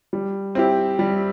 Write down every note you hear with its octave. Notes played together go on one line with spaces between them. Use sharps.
G3
C4 E4 G4
G3